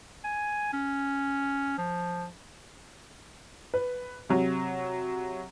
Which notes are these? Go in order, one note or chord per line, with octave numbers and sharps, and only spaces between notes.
G#5
C#4
F3
B4
C3 F#3